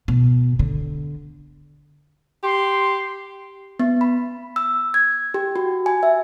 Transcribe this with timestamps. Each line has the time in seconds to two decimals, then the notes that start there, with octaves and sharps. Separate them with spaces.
0.08 B2
0.59 D3
2.43 G4 C6
3.79 B3
4.01 B5
4.56 E6
4.94 G#6
5.34 G4
5.56 F#4
5.86 G#5
6.03 E5